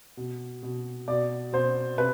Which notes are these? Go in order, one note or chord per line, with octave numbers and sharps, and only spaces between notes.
B2
B2
B2 D5
B2 C5
C3 B4